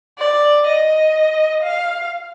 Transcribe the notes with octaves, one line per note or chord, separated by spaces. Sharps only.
D5
D#5
F5